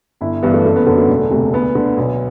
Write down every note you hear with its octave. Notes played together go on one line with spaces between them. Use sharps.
G1 E4
G2 E3 B3
A3
F#1 A3
B3
F#2 D3 B3
A3
E1
D2 C3
D2 B3
D3
B1